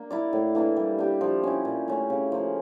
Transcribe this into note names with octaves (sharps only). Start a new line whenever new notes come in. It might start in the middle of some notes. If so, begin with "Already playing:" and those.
Already playing: A#3 D4
E4 A#4 D5
A2
E3 A#3 D4
G3
D4 G4
F3
C#4 E4
A#2
A3 C#4
C#3
F3 A#3